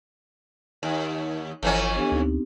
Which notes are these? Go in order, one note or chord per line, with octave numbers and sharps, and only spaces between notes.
D#2
G1 F2 E3 C#4
B3 D4 G4
D2 C4 D#4